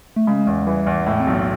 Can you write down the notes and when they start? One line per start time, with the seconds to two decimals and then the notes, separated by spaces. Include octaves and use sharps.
0.16 A3
0.27 C#3 G#3
0.47 E2
0.67 E3 G3
0.86 E2
1.06 A2 G#3
1.20 C4
1.27 B1
1.33 B3